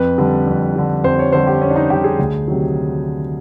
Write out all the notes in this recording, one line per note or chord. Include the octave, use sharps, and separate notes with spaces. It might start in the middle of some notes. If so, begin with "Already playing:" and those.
Already playing: F2 B4
D3 G3
F2
D3 G3
F2 C5
C#5
D3 G3 C5
G4
F2 C#4
D4
D#4
D3 G3 G4
G#4
D2
C3 D#3 F#3